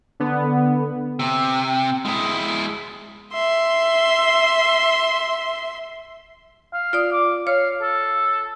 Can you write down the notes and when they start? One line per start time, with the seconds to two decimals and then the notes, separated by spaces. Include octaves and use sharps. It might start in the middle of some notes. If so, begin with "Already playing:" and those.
0.20 D3 B3
1.19 C3
2.05 G#3 E4
3.33 E5 C6
6.73 F5
6.93 F4 D5 D#6
7.12 D6
7.47 C#5 F5
7.82 A4